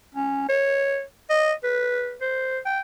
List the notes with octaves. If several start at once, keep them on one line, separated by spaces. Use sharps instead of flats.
C#4
C#5
D#5
B4
C5
G5